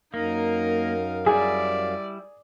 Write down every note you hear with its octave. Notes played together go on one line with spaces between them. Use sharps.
F#2 A#3 D#4 A#4 F5
G3 E4 G#4 D5